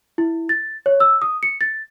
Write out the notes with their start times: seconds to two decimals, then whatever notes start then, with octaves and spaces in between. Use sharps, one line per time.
0.18 E4
0.49 A6
0.86 C#5
1.00 E6
1.22 D#6
1.43 C#7
1.61 A6